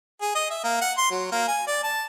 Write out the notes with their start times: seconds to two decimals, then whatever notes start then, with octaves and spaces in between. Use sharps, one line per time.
0.21 G#4
0.35 D#5
0.51 E5
0.64 A#3
0.81 F#5
0.97 C6
1.11 F#3
1.32 A#3
1.48 G#5
1.68 D5
1.84 A5